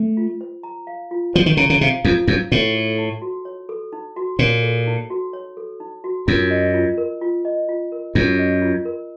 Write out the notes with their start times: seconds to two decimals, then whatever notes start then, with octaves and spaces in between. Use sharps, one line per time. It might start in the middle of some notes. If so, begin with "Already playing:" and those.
Already playing: A3
0.17 F4
0.41 C5
0.63 A#5
0.87 F5
1.11 F4
1.34 F3 C5
1.46 D#3
1.57 C#3 A#5
1.70 C#3
1.81 C3 F5
2.05 F2 F4
2.28 F#2 C5
2.52 A2 C#5
2.74 A4
2.98 D#4
3.22 F#4
3.45 C#5
3.69 A4
3.92 D#4
4.16 F#4
4.39 A#2 C#5
4.63 A4
4.87 D#4
5.10 F#4
5.33 C#5
5.57 A4
5.80 D#4
6.04 F#4
6.27 F#2 F4
6.51 D#5
6.74 F4
6.98 A#4
7.21 F4
7.45 D#5
7.68 F4
7.92 A#4
8.15 F#2 F4
8.39 D#5
8.62 F4
8.85 A#4